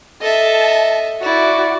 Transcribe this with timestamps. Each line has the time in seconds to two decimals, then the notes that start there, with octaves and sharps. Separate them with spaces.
0.21 A4 D#5 E5 A5
1.22 E4 F#4 D5